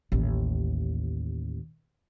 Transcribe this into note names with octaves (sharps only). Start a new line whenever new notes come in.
A1 D#2